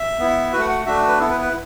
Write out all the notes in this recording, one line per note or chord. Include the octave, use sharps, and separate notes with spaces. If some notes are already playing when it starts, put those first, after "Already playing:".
Already playing: E5
B3 E4
A3 F#4 B4 F#5
F#5
A3 D4 F#4 E5
B4
B3 E4 A4
B4
B4